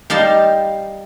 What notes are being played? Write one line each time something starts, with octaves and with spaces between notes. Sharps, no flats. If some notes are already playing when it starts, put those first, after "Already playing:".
G3 D#4 F5 A5 C6